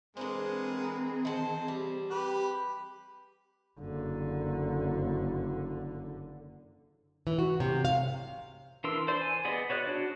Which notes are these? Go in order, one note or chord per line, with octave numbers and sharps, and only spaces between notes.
E3 G#3 B3 C4 D4 G#4 A#4 C5
D#3 C5 A5
G3
G4 B4 B5
F#1 D3
E3
F#4
C3
F5
E3 D4 A#4 C6 E6
C5 D5 C6
G#5
B3 G#4 D5 D#5
F#4 C#5 D5 F#6
D4 F#4